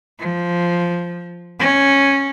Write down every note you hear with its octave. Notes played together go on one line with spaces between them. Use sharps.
F3
C#4